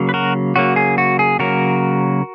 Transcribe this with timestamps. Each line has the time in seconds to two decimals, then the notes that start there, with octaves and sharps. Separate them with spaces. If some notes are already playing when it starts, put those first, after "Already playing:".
Already playing: C#3 F#3 A#3
0.09 B4
0.14 F#4 A#4
0.56 C#3 F#3 A#3 F#4
0.76 G#4
0.98 F#4
1.19 G#4
1.39 C#3 F#3 A#3 F#4 A#4